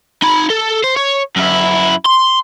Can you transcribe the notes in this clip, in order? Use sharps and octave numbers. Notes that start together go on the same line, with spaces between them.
D#4 B5
A4
C5
C#5
F#2 E4
C6